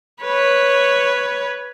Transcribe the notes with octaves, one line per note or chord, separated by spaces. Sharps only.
B4 C#5